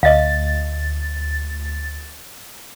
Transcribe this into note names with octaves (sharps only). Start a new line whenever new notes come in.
D2 D#5 F5 A6